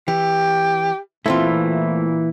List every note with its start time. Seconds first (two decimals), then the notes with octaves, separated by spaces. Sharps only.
0.08 E3 G4
1.26 A#2 E3 A3 C4 E4 F4